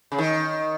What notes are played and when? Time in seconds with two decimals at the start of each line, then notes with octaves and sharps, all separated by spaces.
0.12 C#3
0.18 D#3